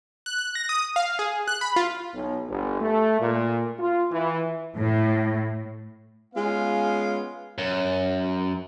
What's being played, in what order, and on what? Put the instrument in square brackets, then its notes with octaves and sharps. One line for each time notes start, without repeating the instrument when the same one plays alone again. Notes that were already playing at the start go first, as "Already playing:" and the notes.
[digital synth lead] F#6
F#6
A#6
D#6
F5
G#4
F#6
B5
F4
[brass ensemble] B1
G1
A3
A#2
F4
E3
[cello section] A2
[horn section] G#3 B3 C#4 F4 F5
[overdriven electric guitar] F#2